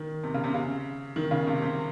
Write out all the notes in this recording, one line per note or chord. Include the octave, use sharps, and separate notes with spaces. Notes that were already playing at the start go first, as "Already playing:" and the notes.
Already playing: D#3
C3
C#3
C3
C#3
D#3
C#3
C3
C3